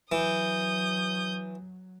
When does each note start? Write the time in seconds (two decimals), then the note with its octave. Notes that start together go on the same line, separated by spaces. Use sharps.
0.12 E3 F#3 D#6 G6